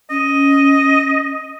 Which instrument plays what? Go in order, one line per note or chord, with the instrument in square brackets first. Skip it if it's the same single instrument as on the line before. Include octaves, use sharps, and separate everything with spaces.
[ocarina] C#4 [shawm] D#5